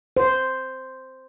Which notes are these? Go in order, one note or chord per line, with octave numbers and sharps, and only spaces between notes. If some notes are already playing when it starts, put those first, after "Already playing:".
C5